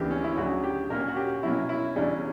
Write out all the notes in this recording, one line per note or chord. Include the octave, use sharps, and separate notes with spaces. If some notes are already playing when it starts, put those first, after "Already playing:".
Already playing: D2 C#3 E3 A#3 G4
C#4
E4
D2 C#3 F#3 F#4
G4
A#2 A#3 C#4 A#4
F#4
G4
B2 F#3 A#3 C#4 E4
E4
E2 C#3 G3 C#4 D4